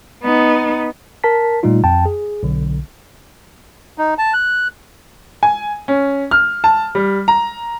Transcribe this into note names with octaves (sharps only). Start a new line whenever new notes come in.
B3 D#4
A#4 A5 B6
A#2 G3 A3 D#4 F4
F2 G5 A5
G#4
B1 D3
D#4
A5
F#6
G#5
C#4
F6
A5
G3
A#5